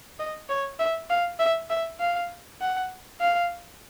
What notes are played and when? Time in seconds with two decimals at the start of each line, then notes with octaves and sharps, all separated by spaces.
0.19 D#5
0.49 C#5
0.79 E5
1.10 F5
1.39 E5
1.70 E5
2.00 F5
2.61 F#5
3.20 F5